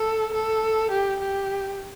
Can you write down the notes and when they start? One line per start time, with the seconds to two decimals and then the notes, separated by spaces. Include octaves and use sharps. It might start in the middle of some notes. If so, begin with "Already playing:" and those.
Already playing: A4
0.33 A4
0.91 G4
1.20 G4